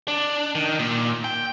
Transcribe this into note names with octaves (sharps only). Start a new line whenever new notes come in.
D4
D#3
A#2
G5